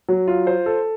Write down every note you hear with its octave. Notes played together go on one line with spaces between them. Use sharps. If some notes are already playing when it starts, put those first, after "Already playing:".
F#3
F4
C5
A4